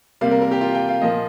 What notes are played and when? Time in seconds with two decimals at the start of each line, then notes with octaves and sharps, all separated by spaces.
0.21 C3 G3 A#3 F5
0.31 A#4
0.42 A#4
0.51 G4
0.61 F4
0.75 G5
0.89 F5
1.02 A#2 F3 A#3 D#5